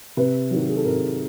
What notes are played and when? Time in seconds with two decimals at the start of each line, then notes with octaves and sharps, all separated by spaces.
0.17 C3 B4
0.51 D#3 F#3
0.69 G#4
0.77 A4
0.85 C3 A#4